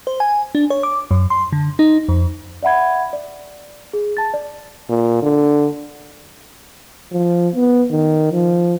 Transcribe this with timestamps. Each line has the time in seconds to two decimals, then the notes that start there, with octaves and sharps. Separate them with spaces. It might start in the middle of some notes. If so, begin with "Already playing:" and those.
0.07 C5
0.20 G#5
0.55 D4
0.70 C#5
0.83 D6
1.11 F#2
1.30 C6
1.52 D3
1.79 D#4
2.08 F2
2.63 D5 E5 F#5 B5 G#6
3.13 D5
3.93 G#4
4.17 A5 A6
4.34 D5
4.89 A#2
5.23 D3
7.12 F3
7.55 B3
7.91 D#3
8.32 F3